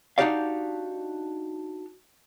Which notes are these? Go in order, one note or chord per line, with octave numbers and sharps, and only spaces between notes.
D4 D#4 F#4 G4 D5 F5